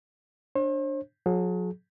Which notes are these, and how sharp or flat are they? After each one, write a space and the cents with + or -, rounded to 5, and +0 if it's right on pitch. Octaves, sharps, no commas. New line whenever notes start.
D4 +0 C5 +45
F#3 -35 G#4 +35